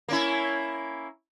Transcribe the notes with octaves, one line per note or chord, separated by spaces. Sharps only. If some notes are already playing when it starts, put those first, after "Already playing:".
A#3 C#4 E4